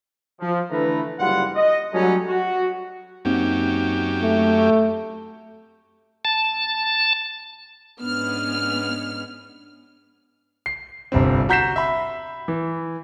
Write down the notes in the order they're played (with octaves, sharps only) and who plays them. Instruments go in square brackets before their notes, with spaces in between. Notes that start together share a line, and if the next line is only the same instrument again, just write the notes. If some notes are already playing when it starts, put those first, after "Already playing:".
[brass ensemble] F3
D3 E3 A3 B4 A#5
F#1 G3 F4 F#5
D#5
F#3 G3 A3 C#4 D#4
F#4
[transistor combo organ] F#2 G4 [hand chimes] A#3 C4 D#4
[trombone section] A3
[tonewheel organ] A5
[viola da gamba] G#2 C#4 D4 [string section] B3 F6
[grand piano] C7
G1 C2 G3 C4
F#4 A#5 G6 B6 C7 E7
E5 B5
E3